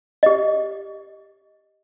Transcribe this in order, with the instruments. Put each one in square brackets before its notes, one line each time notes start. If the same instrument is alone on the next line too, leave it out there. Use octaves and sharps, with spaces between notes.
[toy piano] G4 D#5